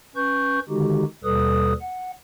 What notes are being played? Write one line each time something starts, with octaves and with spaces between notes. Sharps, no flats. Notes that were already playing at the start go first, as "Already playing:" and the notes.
C#4 B4 C#6 G6
D3 D#3 G#3 D#4 F#4 G4
D#2 B2 G3 A4 B4 D#6
F#5